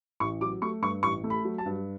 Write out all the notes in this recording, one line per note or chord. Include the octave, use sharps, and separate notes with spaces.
A1 C#6
F#3 D6
A3 C#6
G2 C#6
A1 C#6
A3
B5
F#3
A5
G2